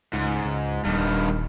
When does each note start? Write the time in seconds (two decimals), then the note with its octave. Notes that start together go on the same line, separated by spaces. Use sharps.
0.13 C#2 G#2
0.45 C#2
0.85 D#1 G2 D#3